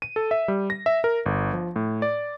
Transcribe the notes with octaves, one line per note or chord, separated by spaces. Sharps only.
D#7
A4
E5
G3
A#6
E5
A#4
G1
F3
A2
D5